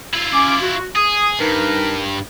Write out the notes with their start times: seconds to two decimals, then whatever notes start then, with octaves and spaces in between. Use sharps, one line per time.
0.14 E4 F4
0.33 C#4 D6
0.62 F#4
0.96 G#4 D#6
1.39 G2 D#4 A#4 B4